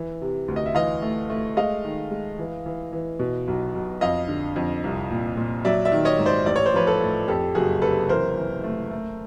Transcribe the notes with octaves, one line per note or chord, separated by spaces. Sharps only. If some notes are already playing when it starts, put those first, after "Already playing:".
Already playing: E3
C3
D2
D#5
E5
E3 D#5 F5
A3
A3
G#3 D#5 F5
D#3
G#3
E3
E3
E3
B2
B1
B1
F2 D#5 F5
D3
F2
C2
A#2
A#2
F#3 D5 E5
D5 E5
D#3
C#5 D#5
G#2
C5 D5
A1 D5
C#5
C5
F3 B4 C#5
A4 B4
A2
F2 G4 A4
F#1 F#4 G#4
C3 A4 B4
E3 A#4 C5
E3
A3
A3